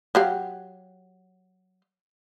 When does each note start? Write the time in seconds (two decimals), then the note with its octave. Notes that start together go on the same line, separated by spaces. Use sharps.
0.15 F#3 G4 F5